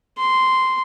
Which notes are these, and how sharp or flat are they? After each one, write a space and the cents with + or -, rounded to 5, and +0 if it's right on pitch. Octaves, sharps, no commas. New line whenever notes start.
C6 -10